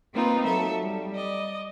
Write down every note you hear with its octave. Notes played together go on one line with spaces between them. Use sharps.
A#3 C4 D#4 F4 B4
F#3 A4 E5
G3
D5 D#5